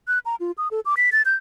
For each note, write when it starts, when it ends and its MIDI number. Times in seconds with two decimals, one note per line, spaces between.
0.08 0.19 90
0.26 0.35 82
0.40 0.52 65
0.58 0.68 87
0.71 0.80 69
0.86 0.95 86
0.97 1.10 95
1.12 1.22 93
1.25 1.35 91